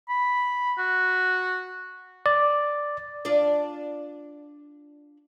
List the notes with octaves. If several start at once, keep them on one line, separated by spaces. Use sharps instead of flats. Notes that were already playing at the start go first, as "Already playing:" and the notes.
B5
F#4
D5
D4 F4 D5